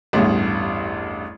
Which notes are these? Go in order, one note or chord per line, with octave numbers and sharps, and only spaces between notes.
A1 E2 G2